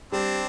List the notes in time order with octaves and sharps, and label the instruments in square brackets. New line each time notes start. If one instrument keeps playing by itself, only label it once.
[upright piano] G3 [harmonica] C4 D4